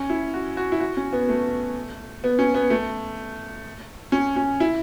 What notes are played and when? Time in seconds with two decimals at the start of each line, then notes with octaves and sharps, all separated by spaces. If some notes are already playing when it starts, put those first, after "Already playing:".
Already playing: C#4
0.10 E4
0.34 F#4
0.57 F#4
0.72 E4
0.80 F#4
0.97 C#4
1.13 B3
1.29 A3
2.24 B3
2.39 C#4
2.54 B3
2.70 A3
4.12 C#4
4.36 C#4
4.60 E4